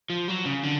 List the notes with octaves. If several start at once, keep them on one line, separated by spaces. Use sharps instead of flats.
F3
F#3
C#3
D3